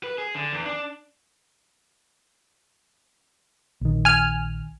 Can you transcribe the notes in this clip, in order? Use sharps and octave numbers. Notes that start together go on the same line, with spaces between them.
B4
G#4
D3
E2
D4
A#1 D#3
G#5 F6